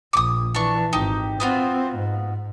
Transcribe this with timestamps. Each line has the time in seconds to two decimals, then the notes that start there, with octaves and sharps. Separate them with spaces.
0.13 A#1 D6 D#6
0.55 E3 D4 C#6
0.93 G#1 D#4 G4
1.40 B3 C4 F4 F#4
1.96 G#2